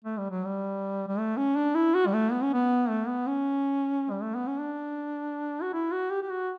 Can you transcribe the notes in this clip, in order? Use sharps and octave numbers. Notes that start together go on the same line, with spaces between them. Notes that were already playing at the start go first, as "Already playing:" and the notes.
A3
G3
F#3
G3
G3
A3
C#4
D4
E4
F#4
G3
A3
B3
C#4
B3
A3
B3
C#4
G3
A3
B3
C#4
D4
F#4
E4
F#4
G4
G4
F#4